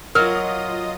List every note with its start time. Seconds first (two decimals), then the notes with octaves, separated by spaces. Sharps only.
0.15 F#3 F4 A#4 D#5 D#6 F6